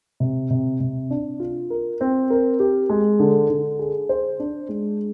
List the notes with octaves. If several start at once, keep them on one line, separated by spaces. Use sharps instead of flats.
C3
C3
C3
D4
F4
A#4
C4
A#4
G4
G#3
D3
D3
G#4
C5
D4
G#3